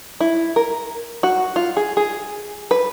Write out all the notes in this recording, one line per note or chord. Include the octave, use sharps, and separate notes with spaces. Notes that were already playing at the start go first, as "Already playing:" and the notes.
E4
A#4
F#4
F4
G#4
G#4
B4